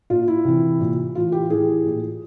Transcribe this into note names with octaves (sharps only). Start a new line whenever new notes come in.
A#2 F4
E4
C3 E3
A#2
A2 E3 F4
G4
A2 E3 G#4
A#2